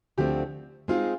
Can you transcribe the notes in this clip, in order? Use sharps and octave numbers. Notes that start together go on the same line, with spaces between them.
D2 D3 F3 A3 C4 G4
G#3 C4 D#4 F4 G#4